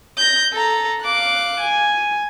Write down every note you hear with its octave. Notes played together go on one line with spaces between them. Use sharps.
G6 A#6
A4 A#5
F5 D6 F#6
G#5